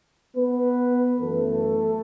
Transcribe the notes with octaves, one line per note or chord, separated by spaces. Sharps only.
B3 B4
F#2 E3 A3 B3 A4